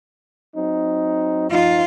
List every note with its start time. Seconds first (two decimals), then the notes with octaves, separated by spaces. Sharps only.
0.55 F#3 C4 D#4
1.51 F3 D#4 F4